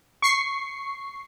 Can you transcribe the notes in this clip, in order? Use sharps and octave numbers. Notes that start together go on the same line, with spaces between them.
C#6 C7